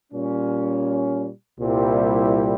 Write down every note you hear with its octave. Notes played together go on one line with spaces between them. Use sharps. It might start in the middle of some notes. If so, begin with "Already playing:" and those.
A#2 G3 C#4
C2 A#2 G3 C4 E4